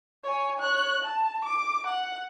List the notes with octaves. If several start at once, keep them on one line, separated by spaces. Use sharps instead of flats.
C#5 G#5
C#5 F#6
A5
D6
F#5